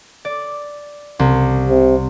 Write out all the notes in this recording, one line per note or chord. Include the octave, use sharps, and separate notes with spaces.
D5
C2
C3